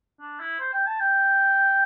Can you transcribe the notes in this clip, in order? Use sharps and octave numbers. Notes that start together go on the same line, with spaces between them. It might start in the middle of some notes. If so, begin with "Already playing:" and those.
D4
E4
C5
G5
A5
G5